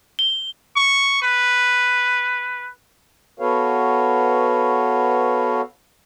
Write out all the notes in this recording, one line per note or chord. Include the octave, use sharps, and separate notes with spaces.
G7
C#6
B4
B3 F#4 A4 B4 C#5 F5